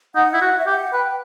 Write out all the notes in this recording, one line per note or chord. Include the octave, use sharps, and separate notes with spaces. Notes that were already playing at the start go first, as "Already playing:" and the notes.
D#4 F#5
E4
F#4
E5
G4 F#5
B4 G5